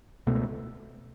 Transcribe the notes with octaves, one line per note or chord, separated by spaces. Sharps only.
C#2 B2 A3